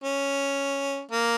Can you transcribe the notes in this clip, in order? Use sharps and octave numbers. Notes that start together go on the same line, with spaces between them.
C#4
A#3